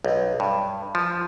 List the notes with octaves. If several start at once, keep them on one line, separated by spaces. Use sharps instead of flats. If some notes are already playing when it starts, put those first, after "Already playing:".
B1
G2
F3